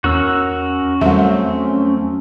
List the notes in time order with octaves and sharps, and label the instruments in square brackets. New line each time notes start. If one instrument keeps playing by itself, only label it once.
[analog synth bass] E2 [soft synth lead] C#4 [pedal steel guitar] F#4 A#4 E6
[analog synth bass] E2 [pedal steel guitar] F#3 A3 C4 [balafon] G3 E5